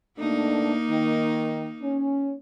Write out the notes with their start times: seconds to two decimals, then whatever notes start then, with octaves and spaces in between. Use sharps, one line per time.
0.18 B2 A3 A#3 D4 D#4
0.89 D#3
1.81 C#4